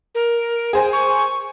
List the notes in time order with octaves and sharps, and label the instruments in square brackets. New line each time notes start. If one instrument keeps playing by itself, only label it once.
[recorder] A#4
[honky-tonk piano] G#4 C5 G#5
[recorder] C#6